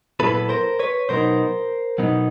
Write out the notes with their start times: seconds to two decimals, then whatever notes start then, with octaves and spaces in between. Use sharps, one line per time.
0.20 A#2 F#3 B3 E4 A4 B4
0.49 A#4 C5
0.79 B4 C#5
1.09 B2 F#3 B3 D#4 A#4 C5
1.98 B2 F#3 B3 D#4